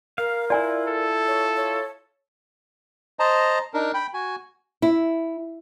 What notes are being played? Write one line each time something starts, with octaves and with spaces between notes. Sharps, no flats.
A#4 F5
E4 F4 D5 G#5
A4
C#5
C#5
C5 D#5 A5 A#5
D4 D#4 A#4
G5 B5
F#4 G#5
E4